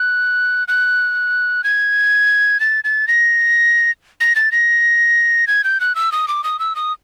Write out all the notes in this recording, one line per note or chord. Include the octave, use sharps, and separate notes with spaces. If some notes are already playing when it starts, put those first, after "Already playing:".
Already playing: F#6
F#6
G#6
A6
A6
A#6
A#6
A6
A#6
G#6
G6
F#6
E6
D#6
D6
D#6
E6
D#6